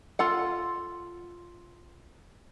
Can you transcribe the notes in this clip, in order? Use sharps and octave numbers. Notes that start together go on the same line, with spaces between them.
F4 A4 F#5